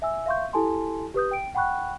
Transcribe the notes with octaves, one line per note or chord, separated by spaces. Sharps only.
E5 G#5 E6
E5 F5 C6 C#6 G6
E4 G4 A4 G#5 A5 C6
G4 B4 D#6 G6
G5 D7
F#5 G5 B5 C#6 F#6